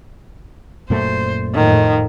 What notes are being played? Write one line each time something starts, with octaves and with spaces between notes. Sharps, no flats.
F#2 A#2 A3 C5
F2 A2 D#3